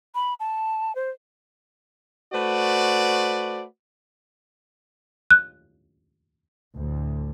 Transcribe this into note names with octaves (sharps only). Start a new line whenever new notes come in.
B5
A5
C5
A3 F#4 B4 C5 D5
F#6
D2 A2